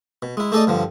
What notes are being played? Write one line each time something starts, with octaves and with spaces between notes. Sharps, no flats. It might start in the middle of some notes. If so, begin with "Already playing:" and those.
B2
G#3 E4
A3 D#4 G#4 A4 D5 D#5
G2 D3 F3